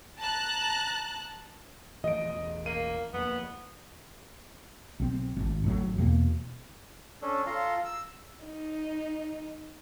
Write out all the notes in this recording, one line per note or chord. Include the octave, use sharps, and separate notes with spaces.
A5 A#5 F#6
A2 E3 F3 D#5 D7
E1 A1
A#3 D#7
F2 A#3 B3
B1 C4
G#1
G#1 A2 F#3
E2 B2 A#3
C#4 D4 A4
F4 A4 A#5 C6
E6
D#4